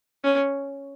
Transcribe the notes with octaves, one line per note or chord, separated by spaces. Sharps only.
C#4